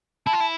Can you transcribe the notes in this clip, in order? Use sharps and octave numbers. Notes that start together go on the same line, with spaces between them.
E4 A5
F4
E4